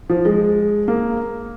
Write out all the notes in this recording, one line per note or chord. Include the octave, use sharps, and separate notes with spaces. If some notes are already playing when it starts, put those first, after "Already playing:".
F3
G#3
A#3